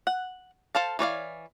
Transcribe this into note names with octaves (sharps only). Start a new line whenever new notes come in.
F#5
A4 C5 F5 A5
E3 C#5 D5 F5